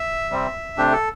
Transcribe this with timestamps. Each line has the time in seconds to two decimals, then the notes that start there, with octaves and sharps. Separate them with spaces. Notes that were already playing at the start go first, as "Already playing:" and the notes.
Already playing: E5
0.31 C3 G3 C4
0.77 C3 A3 D4 G4
0.93 A4